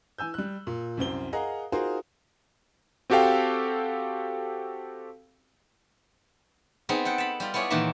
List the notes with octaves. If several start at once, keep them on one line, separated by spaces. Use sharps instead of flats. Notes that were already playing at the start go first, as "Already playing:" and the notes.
E3 G#5 E6 G6
G3 F#6
A#2
C2 F#2 C4 G7
G#4 A#4 D#5 F5 F#5 A#5
D#4 F4 F#4 G#4 A#4 C5
C4 F#4 G4 A4 F5 G5
B3 C4 D#4 G#4
A4 F#5 G5
A5 B5
G3 F4
B3 E4 G#4 C#5 D5
A#2 D#3 E3 A#3 E5